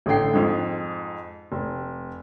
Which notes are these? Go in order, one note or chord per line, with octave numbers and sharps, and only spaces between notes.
A1 D3 A3 G5 C7
F2 G#2
F1